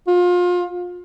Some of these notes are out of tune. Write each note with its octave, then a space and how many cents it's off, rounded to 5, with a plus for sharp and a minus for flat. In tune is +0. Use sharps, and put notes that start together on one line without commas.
F4 +30